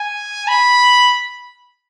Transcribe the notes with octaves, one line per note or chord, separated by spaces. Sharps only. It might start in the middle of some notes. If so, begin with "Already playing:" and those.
Already playing: G#5
B5